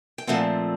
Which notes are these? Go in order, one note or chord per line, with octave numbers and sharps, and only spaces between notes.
G5
A#2 F3 A3 C4 F#5 G#5